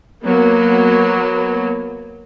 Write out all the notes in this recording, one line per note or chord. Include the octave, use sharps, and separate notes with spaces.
F#3 A#3 B3